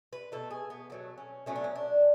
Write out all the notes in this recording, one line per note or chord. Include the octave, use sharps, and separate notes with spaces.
B4
B2 A3 A4
G#4
B3
B2 F#3 A3
C#4
B2 F#3 A3 C#4
D4
C#4
D4